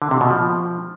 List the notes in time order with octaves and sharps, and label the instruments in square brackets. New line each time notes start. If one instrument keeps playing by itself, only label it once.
[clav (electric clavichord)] D3
C3
B2
F3